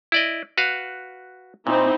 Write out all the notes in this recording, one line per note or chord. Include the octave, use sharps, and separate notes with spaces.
E4 D5 D#5
F#4 B4 F5
A#2 C4 D#4 E4